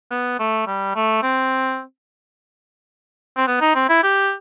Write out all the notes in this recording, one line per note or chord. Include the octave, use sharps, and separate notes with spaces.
B3
A3
G3
A3
C4
C4
B3
D#4
C4
E4
G4